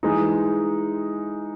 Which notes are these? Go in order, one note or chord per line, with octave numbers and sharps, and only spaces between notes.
E3 G#3 D#4